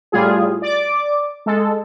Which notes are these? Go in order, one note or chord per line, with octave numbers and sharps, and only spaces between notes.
A2 G3 F4 G#4
D5 D6
G#3 A4